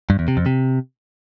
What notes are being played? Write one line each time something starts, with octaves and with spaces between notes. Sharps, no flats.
G2
E2
C3
F2
C3